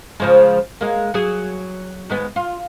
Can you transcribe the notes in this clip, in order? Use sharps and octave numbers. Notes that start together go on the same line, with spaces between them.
C#3 F3 G#3
G#3 A#3
F#3 G#4
D#2 G#3 B3
F4